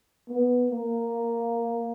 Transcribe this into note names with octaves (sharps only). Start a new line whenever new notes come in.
B3
A#3